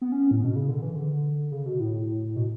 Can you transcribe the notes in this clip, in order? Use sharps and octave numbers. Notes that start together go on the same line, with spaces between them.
B3
C#4
A2
B2
C#3
D3
E3
D3
C#3
B2
A2
B2